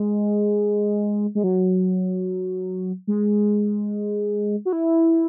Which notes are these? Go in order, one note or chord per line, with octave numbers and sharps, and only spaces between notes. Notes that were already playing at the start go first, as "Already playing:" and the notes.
Already playing: G#3
G#3
F#3
G#3
F#4
E4